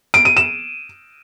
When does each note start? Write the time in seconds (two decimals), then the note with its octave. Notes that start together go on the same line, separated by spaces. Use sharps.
0.14 D7
0.25 D#7
0.37 E7